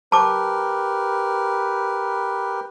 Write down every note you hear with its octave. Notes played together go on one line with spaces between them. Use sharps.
G4 A#4 B4 A5 D6